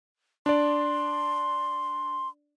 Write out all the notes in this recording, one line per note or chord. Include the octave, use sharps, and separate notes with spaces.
D4 D5 C6